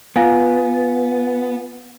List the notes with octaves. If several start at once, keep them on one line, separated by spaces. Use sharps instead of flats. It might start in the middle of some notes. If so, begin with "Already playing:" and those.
B3 F4 F5 G#5